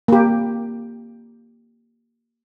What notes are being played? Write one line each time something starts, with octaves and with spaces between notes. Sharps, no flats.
A#3 G4